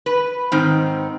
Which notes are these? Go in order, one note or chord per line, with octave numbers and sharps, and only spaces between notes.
B4
G#2 D#3 C4